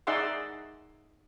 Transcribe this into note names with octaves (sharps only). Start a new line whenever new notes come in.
D#4 G#4 D5 E5 F#5 C6